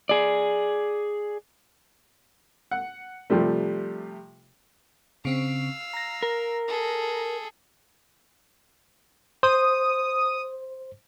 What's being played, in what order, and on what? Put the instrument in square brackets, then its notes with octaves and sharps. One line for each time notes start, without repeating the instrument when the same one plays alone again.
[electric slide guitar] G#4 D5
[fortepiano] F#5
C3 F3 G3 A3
[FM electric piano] C#3 C4 [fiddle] F5 E6
[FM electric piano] A#5 A#6
[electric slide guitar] A#4
[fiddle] G#4 A4
[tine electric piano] C5 [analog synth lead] D#6